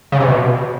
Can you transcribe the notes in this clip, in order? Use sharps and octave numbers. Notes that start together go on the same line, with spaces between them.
C#3
C3
B2